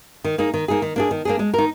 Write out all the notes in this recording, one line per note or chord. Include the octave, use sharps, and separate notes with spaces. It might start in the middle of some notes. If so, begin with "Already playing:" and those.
D#3
A#3 D#4 G#4
D#3
A#3 D#4 G#4
D#3
A#3 D4 G#4
D#3
A#3 D4 G#4
G#3
D#4 A#4